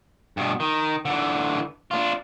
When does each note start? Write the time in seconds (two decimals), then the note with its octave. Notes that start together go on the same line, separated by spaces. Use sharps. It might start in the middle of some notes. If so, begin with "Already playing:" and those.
0.37 G2 B2
0.60 D#3
1.05 D3 E3
1.91 D4 F4